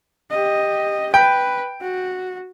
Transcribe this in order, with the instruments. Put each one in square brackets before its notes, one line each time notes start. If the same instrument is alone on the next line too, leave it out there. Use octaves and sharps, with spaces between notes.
[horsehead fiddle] G4 D#5
[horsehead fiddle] B4 [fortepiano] G5
[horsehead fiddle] F#4